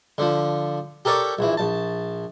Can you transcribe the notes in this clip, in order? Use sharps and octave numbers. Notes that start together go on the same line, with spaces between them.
D3 F3
G4 A4 A#4 C#5 D5
A#1 E3
A#1 A5